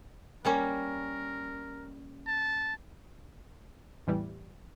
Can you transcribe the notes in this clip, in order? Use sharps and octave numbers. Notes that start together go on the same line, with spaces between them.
G3 A#3 C#4 A#4
A5
A1 E2 E3 G3